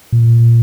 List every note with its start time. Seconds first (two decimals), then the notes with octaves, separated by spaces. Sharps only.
0.13 A#2